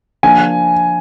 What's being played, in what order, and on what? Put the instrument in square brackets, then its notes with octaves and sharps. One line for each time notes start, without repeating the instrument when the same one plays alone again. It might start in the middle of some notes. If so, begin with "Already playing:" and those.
[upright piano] F3 A#3 D4 G#5